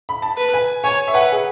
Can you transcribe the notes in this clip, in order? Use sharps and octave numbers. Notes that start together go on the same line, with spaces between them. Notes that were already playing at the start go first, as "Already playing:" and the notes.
B5
A5
B4
G#5
C#5 G#5
E5
B4 F#5
G#4